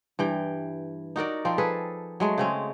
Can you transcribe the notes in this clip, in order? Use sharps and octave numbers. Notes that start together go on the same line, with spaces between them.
G2 E3 G5
D#4 F#4 A#4 D5
F3 C4
G#4 A4 B4
F#3 G#3 A3
C#3 C4 C#4